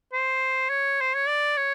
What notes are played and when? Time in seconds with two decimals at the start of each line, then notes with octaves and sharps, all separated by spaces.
0.13 C5
0.70 C#5
1.01 C5
1.14 C#5
1.27 D5
1.57 C#5